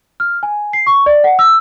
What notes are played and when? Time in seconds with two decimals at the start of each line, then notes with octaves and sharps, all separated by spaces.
0.20 F6
0.43 G#5
0.73 C7
0.87 C#6
1.06 D5
1.24 F#5
1.39 E6